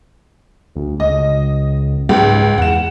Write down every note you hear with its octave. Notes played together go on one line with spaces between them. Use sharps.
D2
C#2 D#5
C#2 G#2
E2 F#5 E7